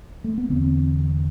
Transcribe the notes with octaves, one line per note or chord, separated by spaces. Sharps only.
A3
B3
E2 D3 C4